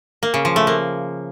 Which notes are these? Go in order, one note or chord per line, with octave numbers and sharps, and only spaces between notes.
A#3
C#3
F3
A3
A#3